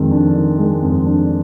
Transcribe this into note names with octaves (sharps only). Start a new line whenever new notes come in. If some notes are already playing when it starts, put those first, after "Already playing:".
Already playing: F2 D#3 G#3
D4
D#3
G#3
F2
D4